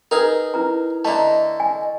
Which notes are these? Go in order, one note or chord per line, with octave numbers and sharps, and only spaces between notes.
D#4 G#4 A#4 B4
E4 B4 A#5
D3 A3 D#5 A5 A#5
G#5